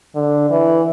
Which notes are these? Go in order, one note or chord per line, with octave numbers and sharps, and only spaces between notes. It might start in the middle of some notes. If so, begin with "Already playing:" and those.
D3
E3